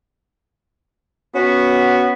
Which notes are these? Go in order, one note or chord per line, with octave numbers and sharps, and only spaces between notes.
B3 C#4 F#4